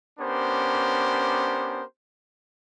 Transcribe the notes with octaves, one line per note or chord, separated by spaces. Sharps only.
B3 C#4 D4 G4 A#4 C5